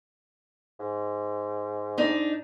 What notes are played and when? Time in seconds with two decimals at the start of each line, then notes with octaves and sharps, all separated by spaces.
0.79 G#2
1.98 D4 D#4